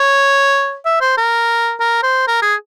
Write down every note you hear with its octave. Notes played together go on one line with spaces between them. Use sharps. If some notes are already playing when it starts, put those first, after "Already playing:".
Already playing: C#5
E5
C5
A#4
A#4
C5
A#4
G#4